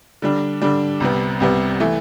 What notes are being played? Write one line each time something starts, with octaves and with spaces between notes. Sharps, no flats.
D3 G3 D4
D3 G3 D4
C2 C3 G3 B3
C2 C3 G3 B3
E3 A3